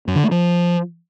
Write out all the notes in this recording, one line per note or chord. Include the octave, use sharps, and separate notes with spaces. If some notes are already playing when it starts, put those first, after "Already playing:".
F#2
D3
A3
F3